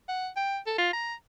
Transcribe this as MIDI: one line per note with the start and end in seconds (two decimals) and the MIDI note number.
0.08 0.29 78
0.36 0.59 79
0.67 0.75 69
0.78 0.92 65
0.93 1.14 82